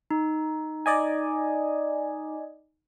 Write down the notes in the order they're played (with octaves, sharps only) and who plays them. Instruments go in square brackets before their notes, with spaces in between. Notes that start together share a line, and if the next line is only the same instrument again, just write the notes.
[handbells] D#4
[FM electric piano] D5 D#5 G#5